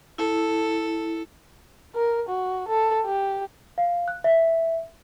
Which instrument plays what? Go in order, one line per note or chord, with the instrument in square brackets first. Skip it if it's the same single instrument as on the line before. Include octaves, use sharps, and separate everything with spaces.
[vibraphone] E4 [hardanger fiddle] A4
[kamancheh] A#4
F#4
A4
G4
[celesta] F5
F#6
E5